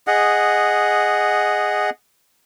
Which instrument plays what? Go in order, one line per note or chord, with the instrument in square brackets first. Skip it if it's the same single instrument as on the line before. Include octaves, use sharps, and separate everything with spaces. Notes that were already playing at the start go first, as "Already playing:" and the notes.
[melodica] G#4 D#5 F#5